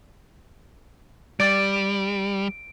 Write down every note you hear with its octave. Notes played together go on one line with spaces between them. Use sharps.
G3 D5 D6 A6 D7